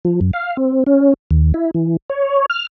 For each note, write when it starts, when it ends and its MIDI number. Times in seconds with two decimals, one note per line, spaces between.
0.05 0.20 53
0.21 0.31 42
0.33 0.57 77
0.57 0.84 60
0.86 1.14 61
1.31 1.52 39
1.54 1.71 64
1.74 1.97 52
2.10 2.46 73
2.50 2.67 89